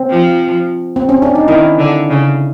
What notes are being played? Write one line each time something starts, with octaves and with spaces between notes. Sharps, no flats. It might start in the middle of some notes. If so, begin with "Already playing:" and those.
Already playing: C4
F3
C4
C#4
D4
D#4
D#3 E4
D3
C#3